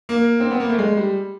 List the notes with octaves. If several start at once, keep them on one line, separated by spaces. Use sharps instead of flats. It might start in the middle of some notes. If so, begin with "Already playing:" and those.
A#3
C4
B3
A#3
A3
G#3
G3